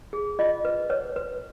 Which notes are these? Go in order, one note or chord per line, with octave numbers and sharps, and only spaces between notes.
G#4
F4 D#5
B4
B4 C#5
B4